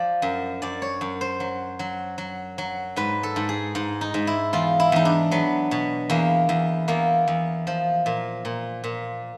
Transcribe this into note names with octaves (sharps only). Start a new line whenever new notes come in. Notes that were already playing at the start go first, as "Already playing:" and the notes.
Already playing: F3 D5
F#2
F#2 D5
C#5
F#2
C5
F#3
F#3
F#3
F#3
G#2 B4
A4
G#2
G#4
G#2
D#4
G#2
E4
E2 F4
E4
E2 D#4
D4
F#3 B3
B2
E2 A#3
E2
E2 A#3
E2
F3
A#2
A#2
A#2